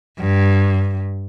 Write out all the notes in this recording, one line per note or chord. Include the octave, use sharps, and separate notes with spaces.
G2